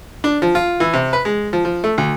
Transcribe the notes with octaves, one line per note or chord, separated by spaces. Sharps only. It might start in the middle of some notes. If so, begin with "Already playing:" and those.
D4
F3
F4
E3
C3
B4
G#3
F3
F3
A3
D2